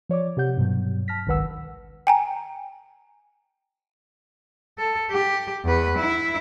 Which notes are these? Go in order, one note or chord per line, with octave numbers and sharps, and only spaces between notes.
F3 C#5 D5 D6
C3 G4 F#5 G6
G2 B2 F#3
A5 F6 A#6 B6
G#1 C#2 D#3 B4 F#5 E6
G5 G#5 A#5
A4
G4
E2 B4
E4 E5